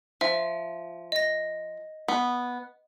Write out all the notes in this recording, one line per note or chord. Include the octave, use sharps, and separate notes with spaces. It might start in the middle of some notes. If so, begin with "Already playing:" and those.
F3 E5
D#5 A#6
B3